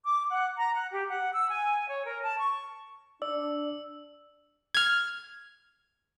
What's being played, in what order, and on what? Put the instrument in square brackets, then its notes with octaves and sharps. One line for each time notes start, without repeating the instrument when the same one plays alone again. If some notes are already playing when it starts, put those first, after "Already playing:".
[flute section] D6
F#5
A#5
F#5
G4
F#5
E6
G#5
C#5
A#4
A5
C#6
[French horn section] D4 [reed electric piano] D5 [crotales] E6
[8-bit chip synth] F6 G#6